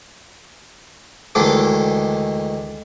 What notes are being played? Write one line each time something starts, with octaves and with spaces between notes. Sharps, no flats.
D2 D#3 E3 G#3 A4 D6